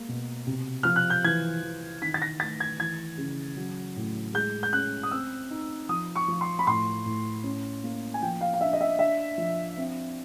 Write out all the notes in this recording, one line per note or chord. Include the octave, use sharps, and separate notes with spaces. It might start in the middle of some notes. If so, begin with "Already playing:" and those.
Already playing: G#3 A#3
B2
C3
F3 F6
F#6
G6
E3 G#6
E3
D#3 B6
A6
A#6
A3 A6
G#6
E3 G#6
C#3
F#3
A2
G#3 G6
G6
C#4 F#6
D#6
C4 E6
D#4
F3 D#6
C#6
F3
C6
B5
A2 C6
A2
C#4
A#3
G#5
F3 G5
F5
F5
D4 E5
D#5
E5
D4 E5
F3
C4